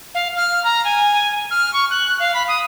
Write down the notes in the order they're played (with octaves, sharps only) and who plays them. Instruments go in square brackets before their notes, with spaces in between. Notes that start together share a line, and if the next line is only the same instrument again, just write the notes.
[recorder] F5
F6
A#5
G#5
F6
C#6
F#6
F5
B5
D#6